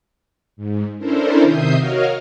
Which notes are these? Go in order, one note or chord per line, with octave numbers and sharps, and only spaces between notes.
G#2
C#4 D4 E4 A4 A#4 C5
C3 D#3 E5 D#6 G6 C7
F#4 A#4 C#5 D#5 F5 F6